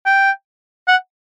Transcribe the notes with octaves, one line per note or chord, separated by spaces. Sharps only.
G5
F#5